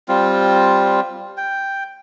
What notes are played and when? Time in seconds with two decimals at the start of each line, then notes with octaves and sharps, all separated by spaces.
0.08 G3 C4 F4
1.37 G5